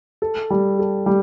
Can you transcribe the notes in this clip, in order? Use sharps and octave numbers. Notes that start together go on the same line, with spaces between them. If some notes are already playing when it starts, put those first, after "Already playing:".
A4
G3
A4
G3